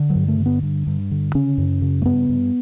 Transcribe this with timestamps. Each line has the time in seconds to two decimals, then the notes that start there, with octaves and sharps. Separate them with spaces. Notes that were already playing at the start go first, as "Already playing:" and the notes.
Already playing: D3
0.10 F#3
0.15 G2
0.28 A3
0.40 D3
0.46 B3
0.63 G2
0.87 G2
1.11 D3
1.35 C#3 C#4
1.58 F#2
1.82 C#3
2.02 A3
2.06 G2 B3
2.29 G2